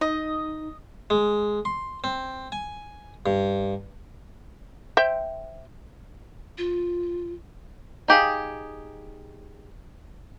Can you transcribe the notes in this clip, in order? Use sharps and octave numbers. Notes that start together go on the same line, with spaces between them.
D#4 D#5
G#3
C6
C4
G#5
G2
C5 E5 G5
F4
D#4 G4 G#4 F5